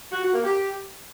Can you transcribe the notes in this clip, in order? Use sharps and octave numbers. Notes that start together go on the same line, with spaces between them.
F#4
F#4
A#3
G4